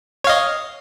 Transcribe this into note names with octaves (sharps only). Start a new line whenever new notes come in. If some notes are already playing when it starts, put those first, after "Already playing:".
C#5 D#5 F5